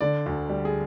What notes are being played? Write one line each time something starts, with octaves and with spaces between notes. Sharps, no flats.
D3 D5
D2
G3
G#4